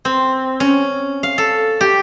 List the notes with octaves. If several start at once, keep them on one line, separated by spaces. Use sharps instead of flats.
C4
C#4
F5
A4
G4